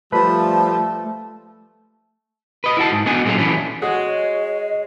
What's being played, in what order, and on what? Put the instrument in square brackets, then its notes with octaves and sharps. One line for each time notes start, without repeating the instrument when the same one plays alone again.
[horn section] F3 G3 [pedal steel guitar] A3 [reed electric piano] B4 B5 [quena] A5
[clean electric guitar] B4 D#5
E4 F#4 A5
G#2
B3 D4 F#4 G#4 D#5 G#5
A#2 F#3 A3 B3 C#4 F4
D3 E3 A3 C#4 D4
[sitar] G#3 [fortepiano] F#4 G#4 [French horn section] C#5 [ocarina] D#5